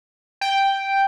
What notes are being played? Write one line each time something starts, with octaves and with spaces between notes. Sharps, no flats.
G5